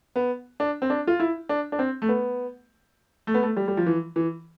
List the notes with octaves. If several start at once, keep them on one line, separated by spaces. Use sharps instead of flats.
B3
D4
C4
D4
F4
E4
D4
D4
C4
A3
B3
A3
B3
A3
G3
G3
F3
E3
E3